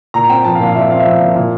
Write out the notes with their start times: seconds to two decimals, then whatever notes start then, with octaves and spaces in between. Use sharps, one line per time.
0.14 A#2 A#5
0.30 C4 G5
0.45 F3 A5
0.55 F5
0.60 A#2
0.65 F5
0.75 A#2 E5
0.90 C4 F5
1.00 E5
1.05 F3 F5
1.20 A#2
1.36 A#2